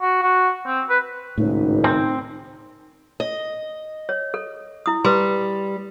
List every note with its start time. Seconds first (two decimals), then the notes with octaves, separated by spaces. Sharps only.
0.01 F#4
0.23 F#4
0.66 C4
0.90 B4
1.38 G#1 C#2 A2 D#4
1.84 C4
3.20 D#5
4.09 C#5
4.34 A4
4.86 E4 D#6
5.04 G3 B4 C6